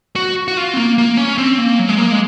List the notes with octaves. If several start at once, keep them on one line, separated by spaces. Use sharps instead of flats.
F#4
F#4
F4
C4
A#3
A#3
C#4
C4
A#3
F#3
G#3
A#3
G#3